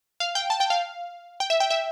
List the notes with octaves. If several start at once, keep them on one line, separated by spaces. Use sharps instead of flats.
F5
G5
A5
G5
F5
G5
E5
G5
E5